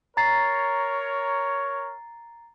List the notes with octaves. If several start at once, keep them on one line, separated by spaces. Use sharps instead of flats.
A#4 C#5 A#5 A6 C7